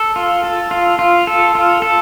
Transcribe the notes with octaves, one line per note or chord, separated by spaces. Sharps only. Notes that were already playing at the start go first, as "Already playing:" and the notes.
Already playing: A4
F4
A4
F4
F4
A4
F4
A4